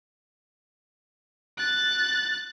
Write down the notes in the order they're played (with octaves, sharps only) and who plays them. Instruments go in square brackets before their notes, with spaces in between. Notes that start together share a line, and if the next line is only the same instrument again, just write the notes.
[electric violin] F#6 A6